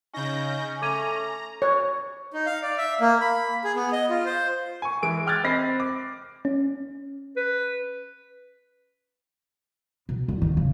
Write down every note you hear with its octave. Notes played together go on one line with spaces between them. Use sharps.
C#3 C#4 D#4 G6 A#6
A3 A#5 D6 G#6 D#7
C#5
D#4
F5
D5
E5
A#3
B5
G#4
B3
D#5
F4
C5
G#5 C#6
E3 G#3 D7
G5 D6 F6 F#6 G#6 A6
C4 D#5 B5 A#6 C7
D6
C#4
B4
B2
E2
D#3
C#3